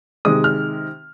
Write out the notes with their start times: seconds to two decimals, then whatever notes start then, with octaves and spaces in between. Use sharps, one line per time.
0.25 C3 D#3 G#3 D#6
0.44 F6